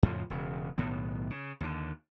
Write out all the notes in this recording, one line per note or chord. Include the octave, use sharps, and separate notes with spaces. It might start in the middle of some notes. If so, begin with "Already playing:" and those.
F2 A2 C#3 F3
E1 C#3
B1 A2 D#3 B3
C#3
D#2 D3